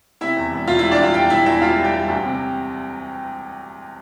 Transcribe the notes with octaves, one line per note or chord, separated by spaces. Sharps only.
C3 E4 E5
E2
E1
E1 F4 F5
G3 E4 E5
D4 D5
E2 F4 F5
E2 G4 G5
E1 E4 E5
E2 E4 E5
G3 F4 F5
G3
G4 G5
G3
D2
C3